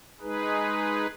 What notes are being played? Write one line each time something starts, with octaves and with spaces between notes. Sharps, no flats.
G#3 D#4 G#4 B4